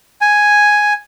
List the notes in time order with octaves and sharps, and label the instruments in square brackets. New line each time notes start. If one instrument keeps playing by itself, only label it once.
[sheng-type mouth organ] G#5